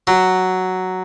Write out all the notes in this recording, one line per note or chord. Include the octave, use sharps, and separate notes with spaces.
F#3